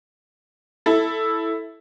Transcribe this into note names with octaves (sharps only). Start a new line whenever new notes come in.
E4 A4